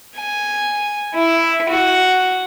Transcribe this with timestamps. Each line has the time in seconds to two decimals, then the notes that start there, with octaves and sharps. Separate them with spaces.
0.17 G#5
1.14 E4
1.69 F#4